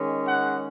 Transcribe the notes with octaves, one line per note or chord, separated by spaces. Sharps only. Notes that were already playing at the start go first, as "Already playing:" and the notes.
Already playing: D#3 G#3 C#4
F#5